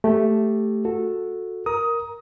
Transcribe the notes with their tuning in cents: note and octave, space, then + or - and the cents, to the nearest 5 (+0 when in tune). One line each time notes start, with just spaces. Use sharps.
A3 +0 G4 +0
F#4 -20 A4 +0
A#4 +0 A#5 +15 D#6 +15